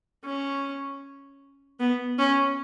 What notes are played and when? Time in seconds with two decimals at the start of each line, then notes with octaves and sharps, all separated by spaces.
0.24 C#4
1.79 B3
2.18 C#4